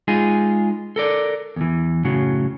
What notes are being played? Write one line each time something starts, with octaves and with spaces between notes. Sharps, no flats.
G#3 D#4 F4 G#4
A4 A#4 D5
E2 E3
F#2 A2 C#3 F#3